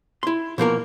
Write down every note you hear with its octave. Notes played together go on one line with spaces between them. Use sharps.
E4 C6
B2 F3 A#3 A#4